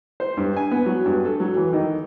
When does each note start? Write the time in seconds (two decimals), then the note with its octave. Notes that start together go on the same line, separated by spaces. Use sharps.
0.20 C5
0.37 G2
0.56 G#5
0.71 B3
0.86 F#3
1.06 G2
1.25 A4
1.40 F#3
1.56 E3
1.73 D#3